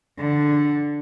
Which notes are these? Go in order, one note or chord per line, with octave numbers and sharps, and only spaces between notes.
D3